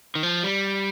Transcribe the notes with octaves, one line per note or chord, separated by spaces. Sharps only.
D#3
F3
G3